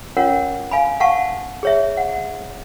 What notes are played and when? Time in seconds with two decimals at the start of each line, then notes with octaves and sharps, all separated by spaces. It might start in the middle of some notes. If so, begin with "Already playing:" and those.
0.17 C#4 F4 A#4 C#5 F#5
0.71 F5 G#5 B5
1.00 F5 F#5 A5 C#6
1.63 G#4 C#5 E5
1.97 F#5